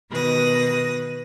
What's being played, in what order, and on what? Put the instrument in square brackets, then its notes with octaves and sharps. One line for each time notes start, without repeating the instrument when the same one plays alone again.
[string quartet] B2 D#3 B4 D#6 A#6